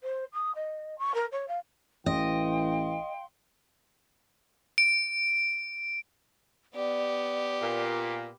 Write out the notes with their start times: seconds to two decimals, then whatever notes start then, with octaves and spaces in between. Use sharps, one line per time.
0.03 C5
0.32 D#6
0.54 D#5
0.98 C#6
1.14 A#4
1.31 C#5
1.48 F5
2.06 A1 E3 D#5 F5 G5 C6
4.78 D7
6.75 B3 G4 D5
7.61 A#2